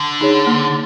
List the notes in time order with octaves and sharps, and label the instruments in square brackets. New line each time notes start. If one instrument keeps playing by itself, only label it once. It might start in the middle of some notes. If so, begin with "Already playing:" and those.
Already playing: [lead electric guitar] D3
[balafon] D#4 G#4 C#5
A#3